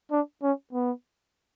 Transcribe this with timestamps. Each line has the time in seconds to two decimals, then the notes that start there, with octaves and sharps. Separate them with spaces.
0.11 D4
0.43 C#4
0.73 B3